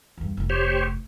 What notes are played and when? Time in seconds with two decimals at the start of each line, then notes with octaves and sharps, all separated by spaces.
0.18 E2 G2
0.37 F1 D2
0.50 G4 C5 C#5